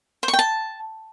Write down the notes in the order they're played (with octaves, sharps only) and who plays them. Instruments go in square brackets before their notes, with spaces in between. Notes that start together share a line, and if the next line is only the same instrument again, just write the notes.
[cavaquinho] C5
C#6
G5
A5